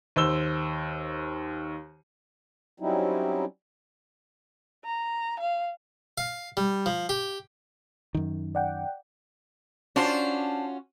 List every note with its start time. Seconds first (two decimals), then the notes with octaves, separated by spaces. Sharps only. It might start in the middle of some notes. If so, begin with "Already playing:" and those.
0.16 D#2 C5 E6 G7
2.80 F#3 G3 C4 C#4 D#4 E4
4.85 A#5
5.40 F5
6.18 F5
6.57 G3
6.86 F3
7.09 G4
8.15 F#2 D#3
8.55 D5 F#5 G5
9.96 C#4 D4 F4 F#4 C5